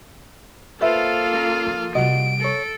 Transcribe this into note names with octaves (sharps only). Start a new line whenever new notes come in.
A#3 F4 A4 B4 C5 E5 F5
C#4 A#4
F3
C3 G3 F#4 D#5 D7
A4 A#4 C#5